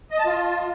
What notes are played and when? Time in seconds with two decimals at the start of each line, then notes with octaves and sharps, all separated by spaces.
0.11 D#5
0.18 A5
0.26 F4